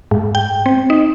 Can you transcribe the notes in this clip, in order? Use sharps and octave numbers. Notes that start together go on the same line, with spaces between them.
G#2
G5
C4
D#4